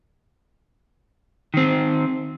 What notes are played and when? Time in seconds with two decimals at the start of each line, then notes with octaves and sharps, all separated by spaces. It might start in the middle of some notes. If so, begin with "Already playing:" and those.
1.54 D#3 C4